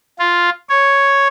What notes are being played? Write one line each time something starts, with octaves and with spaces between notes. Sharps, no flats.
F4
C#5